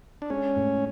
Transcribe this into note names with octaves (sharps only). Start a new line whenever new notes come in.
D4
G#3 C#4
A2